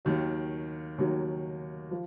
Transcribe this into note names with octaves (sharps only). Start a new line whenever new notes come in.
D#2 D#3 F#3
D#2 D#3 F#3
F3